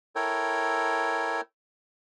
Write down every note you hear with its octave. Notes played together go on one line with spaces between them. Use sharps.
E4 A4 A#4 C#5 G5